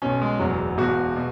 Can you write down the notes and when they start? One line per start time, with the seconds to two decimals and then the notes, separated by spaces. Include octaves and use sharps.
0.02 B1 B2 C#4
0.22 G#3
0.40 F#1 E2 B2 F#3
0.78 E1 E2 B2 F#4
1.16 B2